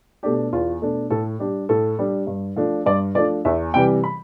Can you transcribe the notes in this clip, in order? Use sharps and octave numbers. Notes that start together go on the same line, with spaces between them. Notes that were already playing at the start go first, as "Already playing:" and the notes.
B2 A3 D4 G4
E2 F4
B2 A3 D4
A2 A4
G3 D4 G4
A2 A4
G3 D4
G2
F3 A3 D4
G2 D5
F3 A3 D4 D5
E2 E5
C3 E3 G3 G5
B5